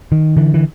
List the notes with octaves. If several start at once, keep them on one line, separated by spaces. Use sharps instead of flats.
D#3
D3 E3
E3